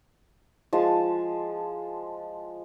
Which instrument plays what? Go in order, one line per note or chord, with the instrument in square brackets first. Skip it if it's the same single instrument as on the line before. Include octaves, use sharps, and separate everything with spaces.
[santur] F3 G#3 A5